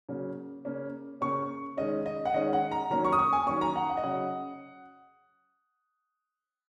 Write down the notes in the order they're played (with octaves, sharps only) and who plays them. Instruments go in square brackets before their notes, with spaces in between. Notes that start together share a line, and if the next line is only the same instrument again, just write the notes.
[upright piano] C#3 F#3 A#3 C#4
C#3 A#3 C#4
C#3 A#3 C#4 C#6
D#3 G#3 C#4 D#5
D#5
F#5
D#3 G#3 C#4 D#5
F#5
A#5
D#3 F#3 A#3 C#4 A#5
C#6
D#6
C#6
G#5
D#3 F#3 A#3 C#4 C#6
A#5
F#5
F#5
D#5
C#3 F#3 C#4 F#5